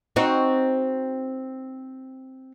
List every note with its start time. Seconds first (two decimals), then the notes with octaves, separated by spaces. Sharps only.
0.16 C4 D#4 F#4